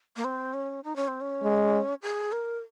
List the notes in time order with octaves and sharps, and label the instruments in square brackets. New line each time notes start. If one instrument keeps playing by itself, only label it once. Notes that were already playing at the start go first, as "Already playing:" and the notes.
[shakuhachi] A#3
C4
C#4
D#4
C#4
C4
C#4
[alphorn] G#3
[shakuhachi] G#4
A#4